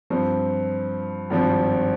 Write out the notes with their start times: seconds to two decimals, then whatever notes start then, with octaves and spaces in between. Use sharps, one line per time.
0.10 G2 F3 C4
1.30 G#1 G2 F3 C4